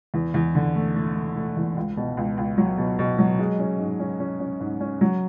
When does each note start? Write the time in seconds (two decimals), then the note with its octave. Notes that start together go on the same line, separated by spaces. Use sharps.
0.14 E2
0.34 E2
0.55 D3
0.75 A3
0.96 A3
1.16 A3
1.36 A3
1.57 E2
1.76 C#2
1.97 B2
2.17 C#2
2.37 C#2
2.58 F#3
2.78 B2
2.99 B2
3.18 F#3
3.39 G#3
3.59 C#4
3.79 G#2
3.99 C#4
4.20 C#4
4.40 C#4
4.60 G#2
4.80 C#4
5.01 F#3